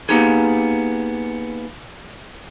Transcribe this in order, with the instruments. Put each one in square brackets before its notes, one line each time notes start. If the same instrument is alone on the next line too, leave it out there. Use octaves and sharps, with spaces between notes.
[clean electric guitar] A#3 B3 D#4 G4 G#4